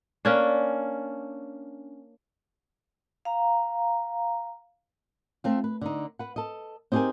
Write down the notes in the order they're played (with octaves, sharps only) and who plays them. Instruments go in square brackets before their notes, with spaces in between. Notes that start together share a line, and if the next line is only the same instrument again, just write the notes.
[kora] A#3 C#4 D4
[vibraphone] F5 A#5
[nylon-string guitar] A3 C4 F4
B4
D3 D#4
B4 F#5
A4 D#5
C4 D#4 G4 G#4 A#4 G#5